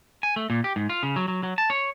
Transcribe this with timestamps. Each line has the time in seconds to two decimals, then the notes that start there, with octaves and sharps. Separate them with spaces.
0.23 G#5
0.36 A3
0.50 A#2
0.64 G4
0.76 G#2
0.89 F4
1.03 C#3
1.16 F#3
1.28 F#3
1.43 F#3
1.58 A5
1.70 C#5